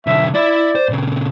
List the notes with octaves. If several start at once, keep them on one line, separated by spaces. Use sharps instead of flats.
B1 D3 E5
E4 D5 E5
C5
A#2 C#3